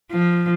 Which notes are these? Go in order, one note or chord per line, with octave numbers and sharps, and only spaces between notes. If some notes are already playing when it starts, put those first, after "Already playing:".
F3